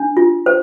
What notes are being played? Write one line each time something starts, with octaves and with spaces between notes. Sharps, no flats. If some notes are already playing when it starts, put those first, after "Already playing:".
Already playing: D4
F4
C5